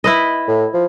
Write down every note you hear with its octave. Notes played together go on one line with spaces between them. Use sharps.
E4 B4 D#5
A2
F3